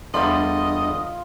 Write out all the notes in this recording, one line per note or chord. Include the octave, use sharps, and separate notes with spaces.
E2 G3 D4 F4 A4 D#5 B5